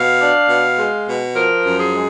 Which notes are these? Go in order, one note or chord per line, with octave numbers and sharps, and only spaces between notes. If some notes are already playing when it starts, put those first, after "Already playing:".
Already playing: B2 F5
D4
B2
G#3
B2
F3 A#4
F#2
G#4
G#3